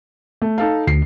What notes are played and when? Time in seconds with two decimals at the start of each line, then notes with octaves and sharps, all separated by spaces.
0.42 A3
0.58 D#4 A4 F5
0.87 D2 C7